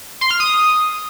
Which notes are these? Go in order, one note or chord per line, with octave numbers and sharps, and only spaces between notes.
C6
F6
D#6